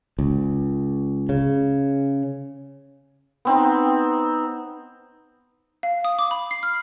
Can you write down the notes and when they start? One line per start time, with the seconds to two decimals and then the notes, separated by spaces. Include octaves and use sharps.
0.19 C#2
1.29 C#3
3.45 B3 C4 D#4
5.83 F5
6.05 D#6
6.19 D6
6.31 B5
6.51 C7
6.63 F6